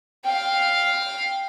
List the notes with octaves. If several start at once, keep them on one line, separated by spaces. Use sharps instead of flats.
F5 G5